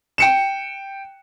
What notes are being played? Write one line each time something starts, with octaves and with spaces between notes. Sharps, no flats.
G5 C#7 E7